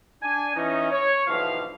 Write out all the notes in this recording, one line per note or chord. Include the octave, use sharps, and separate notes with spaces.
D4 G#5
E3 C#4 D#4
C#5
B1 G2 B2 E3 F3 F5